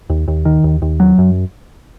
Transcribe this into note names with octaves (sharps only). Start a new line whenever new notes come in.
D#2
D#2
D#3
D#2
D#2
F#3
F#2